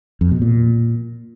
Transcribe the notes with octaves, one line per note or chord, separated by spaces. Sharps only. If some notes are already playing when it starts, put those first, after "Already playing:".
F2
B2
A#2